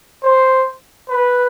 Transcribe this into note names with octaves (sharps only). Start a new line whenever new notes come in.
C5
B4